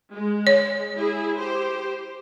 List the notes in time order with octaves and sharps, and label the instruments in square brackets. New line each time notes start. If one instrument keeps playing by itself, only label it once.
[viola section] G#3
[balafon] C#5
[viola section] E4 G#4
G4 C5